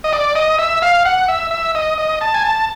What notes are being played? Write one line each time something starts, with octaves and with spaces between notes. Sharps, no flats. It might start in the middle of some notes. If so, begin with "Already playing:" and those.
D#5
D5
D#5
E5
F5
F#5
E5
E5
D#5
D#5
A5
G#5
A5